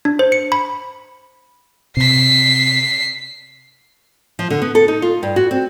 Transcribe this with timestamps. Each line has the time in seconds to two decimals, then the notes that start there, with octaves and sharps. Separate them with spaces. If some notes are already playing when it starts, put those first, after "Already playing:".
0.05 D4
0.19 C5
0.32 C#7
0.52 B5
1.97 C3 B6 C7
4.39 F3
4.50 D3
4.62 B3
4.75 A4
4.88 D#4
5.02 F4
5.23 G2
5.36 F#4
5.51 C4